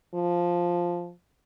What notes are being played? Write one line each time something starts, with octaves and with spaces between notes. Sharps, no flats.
F3